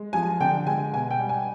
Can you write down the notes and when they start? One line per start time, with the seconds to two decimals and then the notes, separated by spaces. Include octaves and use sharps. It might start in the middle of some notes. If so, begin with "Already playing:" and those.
Already playing: G#3
0.13 F3 G#5
0.40 D3 G5
0.67 G#3 G#5
0.93 B2 G#5
1.11 G5
1.19 G3
1.29 G#5